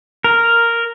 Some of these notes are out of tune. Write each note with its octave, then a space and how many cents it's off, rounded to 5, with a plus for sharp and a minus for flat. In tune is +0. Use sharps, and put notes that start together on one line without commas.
A#4 -5